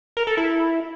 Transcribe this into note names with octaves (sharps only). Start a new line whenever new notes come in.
A#4
A4
E4